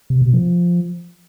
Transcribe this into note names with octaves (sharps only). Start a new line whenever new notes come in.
C3
B2
F3